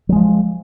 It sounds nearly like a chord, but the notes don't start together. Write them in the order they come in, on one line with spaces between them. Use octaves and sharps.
F#3 G#3 F3